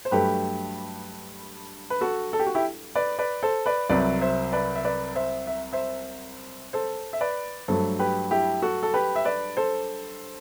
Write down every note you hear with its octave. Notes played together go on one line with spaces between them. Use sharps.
C5
G2 F#3 A3 G4 B4
B4
F#4 A4
A4
G4
F#4
E4 G4
B4 D5
B4 D5
A4 C5
B4 D5
C2 C3 F#3 B4 D5
C5 E5
B4 D5
E5
B4 D5
C5 E5
E5
C5 E5
A4 C5
E5
B4 D5
G2 F#3 A3 A4 C5
G4 B4
E4 G4
F#4 A4
A4
G4 B4
E5
B4 D5
A4 C5